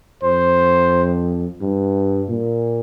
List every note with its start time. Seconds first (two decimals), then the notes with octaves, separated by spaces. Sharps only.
0.23 F2 C5
1.61 G2
2.29 A#2